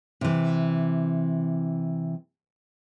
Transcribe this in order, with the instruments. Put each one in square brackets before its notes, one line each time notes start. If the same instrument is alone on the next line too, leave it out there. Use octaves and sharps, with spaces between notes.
[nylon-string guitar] C3 E3